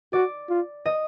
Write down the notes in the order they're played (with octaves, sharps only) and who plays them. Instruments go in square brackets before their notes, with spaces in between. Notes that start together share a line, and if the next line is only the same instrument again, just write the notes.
[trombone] F#4 [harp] D5
[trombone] F4
[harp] D#5